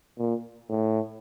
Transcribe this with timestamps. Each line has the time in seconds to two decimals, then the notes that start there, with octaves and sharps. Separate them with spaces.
0.19 A#2
0.69 A2